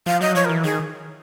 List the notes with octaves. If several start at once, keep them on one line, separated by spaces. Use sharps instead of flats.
F3 F5
F#3 D#5
F3 C#5
A#4
E3
D#3 G#4